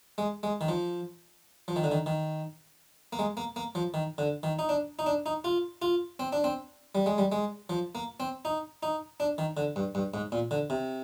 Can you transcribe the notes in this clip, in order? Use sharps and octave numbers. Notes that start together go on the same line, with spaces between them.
G#3
G#3
D#3
F3
F3
D#3
D3
D#3
D#3
A#3
G#3
A#3
A#3
F3
D#3
D3
D#3
D#4
D4
D#4
D4
D#4
F4
F4
C4
D4
C4
G3
G#3
G3
G#3
F3
A#3
C4
D#4
D#4
D4
D#3
D3
G2
G2
G#2
A#2
D3
C3